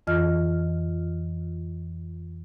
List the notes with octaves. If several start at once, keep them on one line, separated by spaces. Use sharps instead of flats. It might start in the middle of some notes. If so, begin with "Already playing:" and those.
F2 E3 F4 D#5 F6